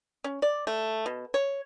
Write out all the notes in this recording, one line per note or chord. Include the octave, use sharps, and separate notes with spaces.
C#4
D5
A3
B2
C#5